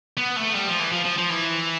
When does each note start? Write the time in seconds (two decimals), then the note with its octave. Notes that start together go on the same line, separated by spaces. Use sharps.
0.17 B3
0.36 A3
0.55 G3
0.67 F3
0.80 E3
0.92 F3
1.04 F3
1.18 F3
1.30 E3